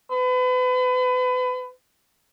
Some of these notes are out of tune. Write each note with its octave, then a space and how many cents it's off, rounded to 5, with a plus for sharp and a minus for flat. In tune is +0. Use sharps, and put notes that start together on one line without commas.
B4 +35